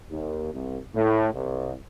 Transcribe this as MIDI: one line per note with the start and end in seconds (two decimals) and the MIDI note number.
0.10 0.51 39
0.52 0.78 36
0.94 1.28 45
1.34 1.74 36